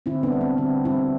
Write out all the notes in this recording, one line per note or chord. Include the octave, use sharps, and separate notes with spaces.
D3 C4 E4
B3 D4
G3
C4
D3 C4
G3 C4 E4